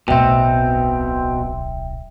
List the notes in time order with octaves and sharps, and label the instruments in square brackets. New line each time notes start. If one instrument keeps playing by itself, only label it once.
[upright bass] D1 B1 [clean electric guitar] B2 C4 [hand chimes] E5 G5